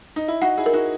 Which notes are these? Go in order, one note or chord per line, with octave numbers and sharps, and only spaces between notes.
D#4
E4
D#4 F#4 F#5
E4 G#4
A#4
D#4 F#4